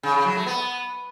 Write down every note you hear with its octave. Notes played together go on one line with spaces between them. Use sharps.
C#3
C#3
F#3
A3
B3